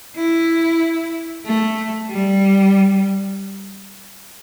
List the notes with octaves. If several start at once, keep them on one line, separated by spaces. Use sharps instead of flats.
E4
A3
G3